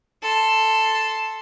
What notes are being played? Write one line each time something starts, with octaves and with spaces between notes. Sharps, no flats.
A4 C6